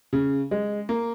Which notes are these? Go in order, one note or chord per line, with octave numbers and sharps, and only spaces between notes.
C#3
G#3
A#3